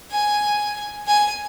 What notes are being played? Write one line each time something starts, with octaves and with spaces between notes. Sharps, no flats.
G#5
G#5